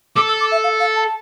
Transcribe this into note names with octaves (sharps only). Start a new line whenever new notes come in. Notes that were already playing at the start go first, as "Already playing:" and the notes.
A4 D6
E6
D6
E5
F5
F5
A5